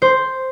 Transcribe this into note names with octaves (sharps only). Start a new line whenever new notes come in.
C5